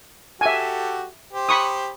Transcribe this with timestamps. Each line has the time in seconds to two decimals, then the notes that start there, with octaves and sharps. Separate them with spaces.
0.41 F#4 G4 A4 E5 G#5
1.33 G4 C5
1.49 B5 C#6 D#6